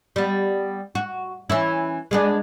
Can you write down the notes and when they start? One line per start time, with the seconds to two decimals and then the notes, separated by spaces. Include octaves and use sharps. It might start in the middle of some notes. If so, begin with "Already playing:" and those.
0.16 G3 B3
0.95 F#4
1.50 E3 C#4 E4
2.11 G#3 B3 D4